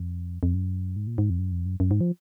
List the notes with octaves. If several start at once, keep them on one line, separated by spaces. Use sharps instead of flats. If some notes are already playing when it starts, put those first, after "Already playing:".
Already playing: F2
F2
F#2
G#2
A#2
G#2
F2
F#2
F2
F#2
F#2
G#2
F3